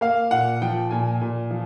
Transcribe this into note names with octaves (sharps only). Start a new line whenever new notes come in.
A#3 F5
A#2 F#5
F3 G5
A#2 G#5
A#2
F3